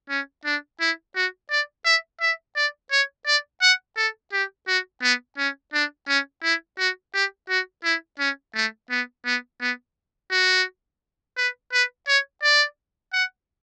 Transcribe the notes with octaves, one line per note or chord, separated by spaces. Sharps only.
C#4
D4
E4
F#4
D5
E5
E5
D5
C#5
D5
F#5
A4
G4
F#4
B3
C#4
D4
C#4
E4
F#4
G4
F#4
E4
C#4
A3
B3
B3
B3
F#4
B4
B4
C#5
D5
F#5